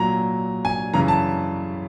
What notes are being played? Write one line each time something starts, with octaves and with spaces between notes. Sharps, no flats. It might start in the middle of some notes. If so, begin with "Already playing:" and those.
Already playing: A#2 F#3 A#5
G#5
F#2 C#3 E3 A#5
A5